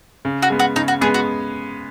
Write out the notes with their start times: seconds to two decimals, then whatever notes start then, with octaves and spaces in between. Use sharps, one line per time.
0.25 C#3
0.42 F#4
0.50 G#3 B3
0.59 F#4
0.76 C#3 D#4
0.88 F#4
1.01 G#3 B3 G#4
1.14 F#4